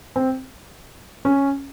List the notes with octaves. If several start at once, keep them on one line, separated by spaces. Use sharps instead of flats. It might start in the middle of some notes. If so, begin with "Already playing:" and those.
C4
C#4